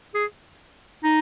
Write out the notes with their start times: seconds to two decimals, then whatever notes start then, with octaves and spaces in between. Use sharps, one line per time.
0.14 G#4
1.03 D#4